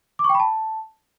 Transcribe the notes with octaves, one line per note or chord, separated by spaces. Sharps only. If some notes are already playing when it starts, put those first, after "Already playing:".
D6
C#6
G5
B5
A5